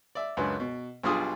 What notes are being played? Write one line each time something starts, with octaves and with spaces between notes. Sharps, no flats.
D5 E5
C#2 F#2 D4 B4
B2
B1 G3 D4 F4 G#4 D#6